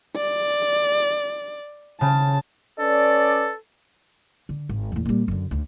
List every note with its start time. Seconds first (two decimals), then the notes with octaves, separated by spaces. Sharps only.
0.16 D5
2.01 C#3 A5
2.79 C#4 A4 B4 D5
4.49 D3
4.69 G#1
4.92 E2 A2
5.06 A#2 G3
5.28 F#2 D3
5.51 D2 D3